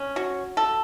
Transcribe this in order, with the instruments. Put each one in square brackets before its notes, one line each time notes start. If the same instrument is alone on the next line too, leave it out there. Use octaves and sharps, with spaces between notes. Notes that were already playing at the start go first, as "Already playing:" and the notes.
Already playing: [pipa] C#4
F#4
A4